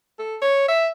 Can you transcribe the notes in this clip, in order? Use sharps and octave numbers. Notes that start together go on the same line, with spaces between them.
A4
C#5
E5